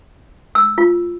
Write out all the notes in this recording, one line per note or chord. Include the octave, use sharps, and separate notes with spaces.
E6
F4